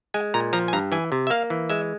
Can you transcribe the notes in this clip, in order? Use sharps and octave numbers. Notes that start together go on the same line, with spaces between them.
G#3 G#5
A#2 A#5
F3 A#5
G#5
G2 A#5
E3 G#5
C3
E5
A#3 F5
E3
G#3 E5